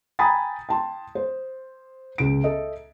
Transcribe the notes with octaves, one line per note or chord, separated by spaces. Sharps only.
G5 G#5 A#5 B5 D#6 A6
G5 A5 C6
C5
C#2 D7
A4 D#5 E5